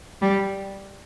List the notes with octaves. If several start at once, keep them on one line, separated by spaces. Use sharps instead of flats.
G3